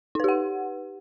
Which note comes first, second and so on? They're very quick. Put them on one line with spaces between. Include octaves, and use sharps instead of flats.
D#4 B4 G4 F#5